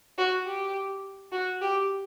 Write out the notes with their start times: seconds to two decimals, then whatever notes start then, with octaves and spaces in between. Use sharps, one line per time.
0.18 F#4
0.46 G4
1.32 F#4
1.62 G4